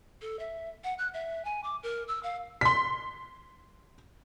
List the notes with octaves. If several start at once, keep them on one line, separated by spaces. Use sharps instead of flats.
A4
E5
F#5
F#6
E5
G#5
D6
A#4
E6
F5
C6 B6